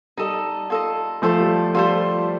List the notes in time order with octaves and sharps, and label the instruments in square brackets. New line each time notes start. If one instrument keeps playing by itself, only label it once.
[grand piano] G3 [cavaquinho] D#4 A4 D#5
[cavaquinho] F4 A4 D#5
[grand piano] F3 A3 [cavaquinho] F4 A4 C5
[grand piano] G3
[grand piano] G3 [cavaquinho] F4 A4 C5